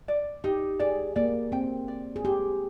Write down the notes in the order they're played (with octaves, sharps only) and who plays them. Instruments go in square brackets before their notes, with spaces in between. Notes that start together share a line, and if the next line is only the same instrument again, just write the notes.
[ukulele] D5
[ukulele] D#4 [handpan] G4
[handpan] G#4 [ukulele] D5
[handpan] A#3 [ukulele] D5
[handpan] C4 [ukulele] G5
[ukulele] D5
[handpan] G#4
[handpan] G4 [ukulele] C5